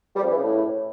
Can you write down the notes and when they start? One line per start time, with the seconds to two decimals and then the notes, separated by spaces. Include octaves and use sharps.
0.16 G3
0.23 F2
0.29 E3
0.36 C#3
0.43 A2